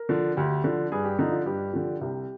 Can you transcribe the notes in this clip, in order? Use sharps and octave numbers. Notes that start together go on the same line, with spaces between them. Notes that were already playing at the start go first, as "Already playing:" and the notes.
Already playing: A#4
D3 F3
D2 G4
D3 F3
G2 G#4
G4
D3 F3 D#4
F4
G2 G4
D3 F3
C2 G4